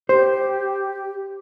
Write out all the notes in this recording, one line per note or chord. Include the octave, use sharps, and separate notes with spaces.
G4 C5